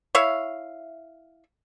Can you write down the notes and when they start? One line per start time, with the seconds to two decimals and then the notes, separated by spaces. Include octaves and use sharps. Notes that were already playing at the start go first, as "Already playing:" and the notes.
0.15 E4 C#5 E5 F5